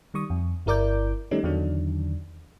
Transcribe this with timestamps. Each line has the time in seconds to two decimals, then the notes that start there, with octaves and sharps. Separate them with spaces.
0.14 D#3 G3 C#6 D#6
0.30 F2
0.66 G1 E4 A#4 D5 D6 G6
1.31 D#3 G3 A3 C#4 D#4
1.43 E2 D3 D#3 F#3 D4